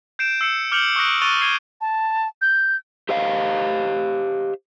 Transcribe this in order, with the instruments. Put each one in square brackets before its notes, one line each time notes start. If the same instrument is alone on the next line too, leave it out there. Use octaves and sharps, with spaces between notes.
[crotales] G6 C7 D7 E7
E6 C7 C#7 E7
D6 F6 G6 C#7 F7 F#7
C#6 D#6 F#6 A#6 D7
C#6 F#6 A6 D#7 F7 G7
F6 G#6 C7 D#7
[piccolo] A5
G6
[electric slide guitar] G4 C5 D#5 F5